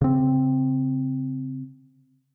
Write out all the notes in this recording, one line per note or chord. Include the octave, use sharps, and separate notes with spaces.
C#3 C4